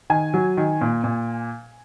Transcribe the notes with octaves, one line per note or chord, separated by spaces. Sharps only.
D#3 G#5
F#3
D#3
A#2
A#2